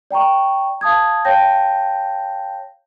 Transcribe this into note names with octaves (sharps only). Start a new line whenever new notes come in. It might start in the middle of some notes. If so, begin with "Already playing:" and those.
D5 G5 A#5 C#6
F5 A5 D#6 G#6
C#5 F5 G5 A5 G6 A#6